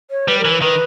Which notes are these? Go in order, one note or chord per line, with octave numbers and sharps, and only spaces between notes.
C#5
G3 B4
A#4
E3
B4
D#3 B4